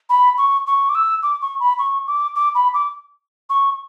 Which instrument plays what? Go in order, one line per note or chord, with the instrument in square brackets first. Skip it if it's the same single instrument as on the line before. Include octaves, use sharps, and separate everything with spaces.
[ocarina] B5
C#6
C#6
D6
E6
D6
C#6
B5
C#6
D6
D6
B5
D6
C#6